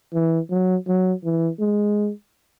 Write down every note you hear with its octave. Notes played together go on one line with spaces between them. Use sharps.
E3
F#3
F#3
E3
G#3